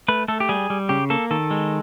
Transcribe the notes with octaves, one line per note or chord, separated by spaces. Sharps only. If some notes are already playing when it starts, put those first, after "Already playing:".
A3 B4
A3 A4
G4
G3 G#4
G3
C#3 G4
A#3 A4
D#3 A4
G#3